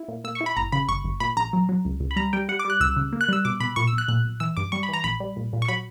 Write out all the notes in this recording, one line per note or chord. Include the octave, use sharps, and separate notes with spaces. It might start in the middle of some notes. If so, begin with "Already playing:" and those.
Already playing: E4
A#2
A#2 E6
C#6
E4
B5
G1 A#5
C#3 B5
G1 C#6
G1
A#2 B5
A#1 A#5
F#3
F#3
C#2
C#2
B5
G3 A#5
G3 G5
G3 F#5
D6
G3
F#6
C#2 E6
C#3
A#3
F#6
G3 E6
B2 D6
B2 B5
A#2 C#6
E6
B1
F#6
A#2 F#6
B1
E3 E6
G2 D6
G3 C#6
B5
E3 A#5
A#1 B5
G3
A#1
A#2
C#6
F#3 B5